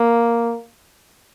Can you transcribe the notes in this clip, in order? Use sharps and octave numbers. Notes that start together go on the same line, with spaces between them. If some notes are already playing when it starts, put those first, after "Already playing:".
Already playing: A#3